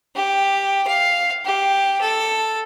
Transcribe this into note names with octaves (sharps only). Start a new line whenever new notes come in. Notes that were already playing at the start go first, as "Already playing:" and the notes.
G4
F5
G4
A4